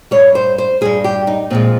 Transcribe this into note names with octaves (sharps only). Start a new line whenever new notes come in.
G2 G3 C#5
C5
C5
G2 G3 G#4
G4
D#4
A#2 F3 G#3 C4